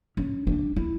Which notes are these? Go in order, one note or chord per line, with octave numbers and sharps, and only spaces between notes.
C#4
D4
E4